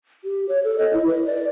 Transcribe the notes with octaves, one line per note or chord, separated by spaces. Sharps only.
G4
C#5
A4
D#5
E4
B4
D5